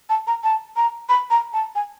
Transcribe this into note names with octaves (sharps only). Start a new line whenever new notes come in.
A5
A#5
A5
A#5
B5
A#5
A5
G#5